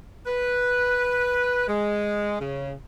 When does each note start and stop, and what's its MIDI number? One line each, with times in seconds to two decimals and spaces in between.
0.26 1.65 71
1.68 2.37 56
2.40 2.71 49